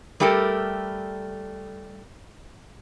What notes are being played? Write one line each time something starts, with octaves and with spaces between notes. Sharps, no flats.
G3 A3 G4 A4 A#4